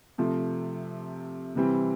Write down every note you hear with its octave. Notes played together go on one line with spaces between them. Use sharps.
C3 F3 A3
C3 E3 G3 C4